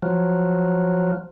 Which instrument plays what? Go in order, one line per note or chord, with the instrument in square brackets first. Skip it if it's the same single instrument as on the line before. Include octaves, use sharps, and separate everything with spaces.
[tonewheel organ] F3 F#3